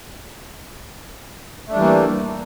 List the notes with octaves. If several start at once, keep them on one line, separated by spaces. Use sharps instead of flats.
E3 G3 A3 A#3 D4